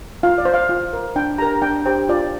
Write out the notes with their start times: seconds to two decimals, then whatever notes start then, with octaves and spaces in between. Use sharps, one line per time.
0.23 F4 F5
0.38 D5
0.45 C5
0.54 F5
0.69 F4
0.93 A#4
1.16 D4 G5
1.38 G4 A#4 A#5
1.62 D4 G5
1.86 G4 C5 G5
2.09 F4 D5